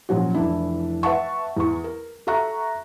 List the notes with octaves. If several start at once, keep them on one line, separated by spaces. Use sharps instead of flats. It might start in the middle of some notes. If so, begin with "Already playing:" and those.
A#2 F3 F#3 C#4 F#4
F1 E3 D4 E4
B4 E5 F#5 A5 C#6
E2 C#6
A#4
F#4 A4 E5 A#5 C#6 F#6